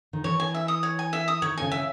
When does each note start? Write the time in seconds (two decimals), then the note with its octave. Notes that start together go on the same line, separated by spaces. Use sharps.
0.13 D#3
0.24 E3 C#5
0.40 G#5
0.54 E5
0.68 D#6
0.83 C#5
0.99 G#5
1.13 E5
1.28 D#6
1.42 D#3 C#5
1.57 C#3 G#5
1.71 E5